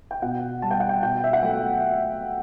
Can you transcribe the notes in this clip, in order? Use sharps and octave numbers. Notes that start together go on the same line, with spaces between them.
G5
B2 F#5
G3 A5
G5
F#5
G5
B2 G5
E5
F#5
F#3 A3 G5